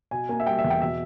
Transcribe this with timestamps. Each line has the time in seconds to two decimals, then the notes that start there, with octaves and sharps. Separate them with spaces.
0.11 B2 G#5
0.29 A#3 G#5
0.40 E5
0.46 G3 G5
0.59 E5
0.64 E2
0.70 G5
0.82 B2 E5